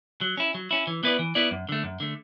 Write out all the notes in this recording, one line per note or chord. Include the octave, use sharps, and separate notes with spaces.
F#3
C#4 E4
F#3
C#4 E4
E3
B3 E4 B4 D5
E3
B3 E4 B4 D5
F#2
D3 A3
F#2
D3 A3